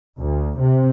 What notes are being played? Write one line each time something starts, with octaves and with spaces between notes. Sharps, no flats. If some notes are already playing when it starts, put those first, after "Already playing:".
D2
C3